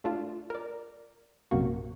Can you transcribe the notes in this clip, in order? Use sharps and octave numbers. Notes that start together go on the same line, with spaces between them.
A3 D4 F4
A#4 D5
A#1 F#2 C3 A#3 F#4